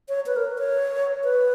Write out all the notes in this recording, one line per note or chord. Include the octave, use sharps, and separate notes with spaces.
C#5
B4
A#4
C#5
B4